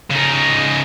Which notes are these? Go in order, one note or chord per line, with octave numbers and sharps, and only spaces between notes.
C#3 D#4